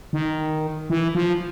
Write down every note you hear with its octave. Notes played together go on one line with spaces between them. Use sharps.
D#3
E3
F3